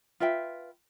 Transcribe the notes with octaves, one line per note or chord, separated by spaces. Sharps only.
F4 B4 E5 G5